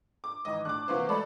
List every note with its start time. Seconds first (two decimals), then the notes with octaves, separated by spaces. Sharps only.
0.24 D6
0.45 G#2 D#3 E3 D#5
0.65 A2 D4 D6 F#6
0.88 C3 E3 A#3 F#4 C5
1.09 G#3 A3 A4 D5 B5